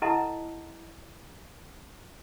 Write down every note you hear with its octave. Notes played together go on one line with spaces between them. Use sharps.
E4 A4 D#5 F#5 A5 A#5